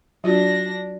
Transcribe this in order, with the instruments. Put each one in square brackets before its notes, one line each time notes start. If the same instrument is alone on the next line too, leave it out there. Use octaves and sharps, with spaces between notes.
[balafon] F#3 F4 F#4 [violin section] D4 A#6